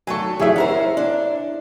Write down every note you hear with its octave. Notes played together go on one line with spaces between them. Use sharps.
F#3 A3 A4 G#5 C#6
E3 A3 E4 G4 G#4 C#5 D5 E5
C#4 A#4 C5 F#5
D4